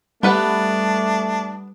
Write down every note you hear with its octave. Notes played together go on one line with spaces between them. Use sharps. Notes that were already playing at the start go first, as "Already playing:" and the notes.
G3 A3 B3 D4 B4 F#5